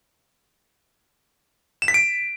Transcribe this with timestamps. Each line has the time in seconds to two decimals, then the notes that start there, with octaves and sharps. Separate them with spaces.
1.82 E7
1.88 B6
1.94 D7